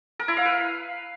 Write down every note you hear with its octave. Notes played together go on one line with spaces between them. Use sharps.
A#4
E4
F5
B4